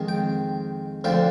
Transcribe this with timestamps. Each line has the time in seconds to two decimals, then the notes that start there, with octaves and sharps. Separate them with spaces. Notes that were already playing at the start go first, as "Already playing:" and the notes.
Already playing: F2 D#3 G#3
0.08 G5
1.04 D2 D3 F3 G5